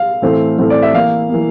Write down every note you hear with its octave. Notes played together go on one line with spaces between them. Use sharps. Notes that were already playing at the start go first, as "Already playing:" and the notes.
Already playing: F5
A2 E3 A3 C4
A2 E3 A3 C4
D5
E5
E3 A#3 F5
E3 A#3